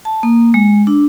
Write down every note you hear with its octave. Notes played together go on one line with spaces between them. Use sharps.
A5
A#3
G#3
D4